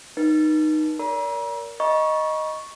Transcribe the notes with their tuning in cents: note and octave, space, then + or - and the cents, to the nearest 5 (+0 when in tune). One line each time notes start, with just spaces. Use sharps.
D#4 -15 B4 -40
A#4 +5 D5 -40 A#5 +40
D#5 +0 A#5 +45 C#6 +0